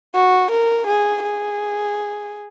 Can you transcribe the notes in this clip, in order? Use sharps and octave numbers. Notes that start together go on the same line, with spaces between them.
F#4
A#4
G#4
G#4